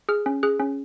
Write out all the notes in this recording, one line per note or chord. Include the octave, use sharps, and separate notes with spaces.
G#4 F6
C#4
G#4 F#6
C#4